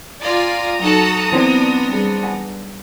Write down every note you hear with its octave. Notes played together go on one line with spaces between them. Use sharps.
F4 D5 G#5 A#5 D#6
F#3 D#4 F#4 A4 A5
E3 B3 C4 D4 C6
G3 G#4
B4 F#5 G#5